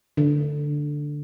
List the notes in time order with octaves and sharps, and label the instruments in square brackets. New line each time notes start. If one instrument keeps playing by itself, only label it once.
[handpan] D3